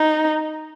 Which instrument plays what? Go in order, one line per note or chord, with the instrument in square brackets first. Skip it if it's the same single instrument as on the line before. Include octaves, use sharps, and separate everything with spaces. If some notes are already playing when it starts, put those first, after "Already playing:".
Already playing: [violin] D#4